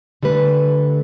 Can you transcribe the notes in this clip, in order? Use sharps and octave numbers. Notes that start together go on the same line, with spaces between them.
D3 G3 A3 B4